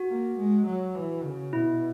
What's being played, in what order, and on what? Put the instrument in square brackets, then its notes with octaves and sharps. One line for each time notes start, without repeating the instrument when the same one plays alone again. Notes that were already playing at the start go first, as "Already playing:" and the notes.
Already playing: [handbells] F#4
[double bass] A#3
G#3
F#3
E3
C#3
[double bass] B2 [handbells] E4